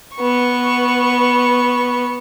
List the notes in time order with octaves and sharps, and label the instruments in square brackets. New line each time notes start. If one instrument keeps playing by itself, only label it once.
[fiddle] B3 C#6